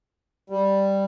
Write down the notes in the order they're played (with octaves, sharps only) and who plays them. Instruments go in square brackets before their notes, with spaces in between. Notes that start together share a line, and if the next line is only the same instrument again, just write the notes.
[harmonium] G3